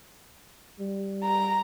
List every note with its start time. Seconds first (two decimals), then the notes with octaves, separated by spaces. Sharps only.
0.80 G3
1.24 A#5